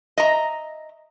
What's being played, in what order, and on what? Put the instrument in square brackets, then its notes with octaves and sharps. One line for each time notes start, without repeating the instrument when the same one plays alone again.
[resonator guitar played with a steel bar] D#5 E5 A#5